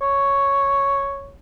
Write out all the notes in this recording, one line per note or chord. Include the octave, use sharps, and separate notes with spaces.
C#5